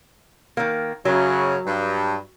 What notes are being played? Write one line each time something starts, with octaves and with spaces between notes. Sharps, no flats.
D#3 A#3
F#2 C#3 F#3
G2